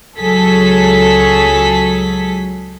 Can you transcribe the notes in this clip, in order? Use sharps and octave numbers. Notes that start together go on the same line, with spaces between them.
C#2 F#3 G#4 A4 B6